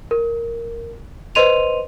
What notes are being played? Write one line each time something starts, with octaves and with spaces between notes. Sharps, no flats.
A#4
B4 C5 D#5 C6 D#7 F7